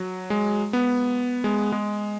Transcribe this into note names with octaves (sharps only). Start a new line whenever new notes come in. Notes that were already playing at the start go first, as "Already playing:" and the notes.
Already playing: F#3
G#3
B3
G#3
G#3